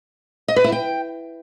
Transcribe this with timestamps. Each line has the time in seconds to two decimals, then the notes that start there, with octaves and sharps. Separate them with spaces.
0.48 D#5
0.56 B4
0.64 E4
0.72 G5